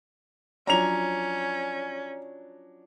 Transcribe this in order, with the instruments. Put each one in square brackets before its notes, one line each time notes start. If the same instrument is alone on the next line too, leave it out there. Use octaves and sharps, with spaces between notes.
[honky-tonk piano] F3 F#3 D4 [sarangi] C#4 [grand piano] A#5 F7